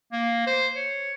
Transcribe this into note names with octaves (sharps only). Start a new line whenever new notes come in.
A#3
C5
C#5